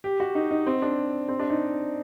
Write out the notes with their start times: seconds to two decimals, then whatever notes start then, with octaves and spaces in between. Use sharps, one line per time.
0.04 G4
0.20 F#4
0.35 D#4
0.51 D#4
0.66 C4
0.82 D4
1.28 C4
1.40 D4
1.50 D#4